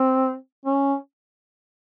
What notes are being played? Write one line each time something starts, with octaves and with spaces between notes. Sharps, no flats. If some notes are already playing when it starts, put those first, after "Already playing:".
Already playing: C4
C#4